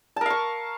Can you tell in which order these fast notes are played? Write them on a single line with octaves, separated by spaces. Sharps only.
A5 A#4 F5 C#6